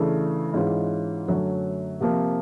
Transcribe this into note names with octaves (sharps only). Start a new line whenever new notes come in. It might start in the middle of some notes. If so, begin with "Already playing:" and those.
Already playing: C#3 E3 A3 D4
G#2 E3 G#3 C#4 F4
F#2 D3 F#3 A3 C#4
C3 F3 A#3